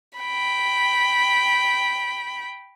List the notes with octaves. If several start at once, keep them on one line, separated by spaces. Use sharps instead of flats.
G5 B5